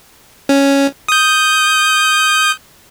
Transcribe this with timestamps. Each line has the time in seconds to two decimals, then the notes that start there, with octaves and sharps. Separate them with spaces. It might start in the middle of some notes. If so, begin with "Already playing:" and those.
0.49 C#4
1.09 D#6 G6